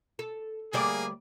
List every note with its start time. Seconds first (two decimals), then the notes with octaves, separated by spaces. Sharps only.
0.19 A4
0.73 D2 G3 A#3 G#4 D5